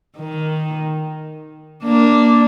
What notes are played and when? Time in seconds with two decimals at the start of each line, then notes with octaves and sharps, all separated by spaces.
0.17 D#3
1.84 A#3 D4